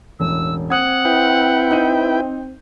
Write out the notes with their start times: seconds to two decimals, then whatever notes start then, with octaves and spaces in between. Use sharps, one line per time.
0.20 E1 A1 E6
0.70 C4 F#5 D#6 G#6
1.05 E4 B4 G5
1.71 D#4 G6 D#7